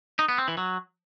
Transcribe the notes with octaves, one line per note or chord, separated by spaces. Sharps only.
D#4
B3
C4
E3
F#3